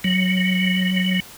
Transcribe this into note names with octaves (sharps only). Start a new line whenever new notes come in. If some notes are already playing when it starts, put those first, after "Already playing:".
F#3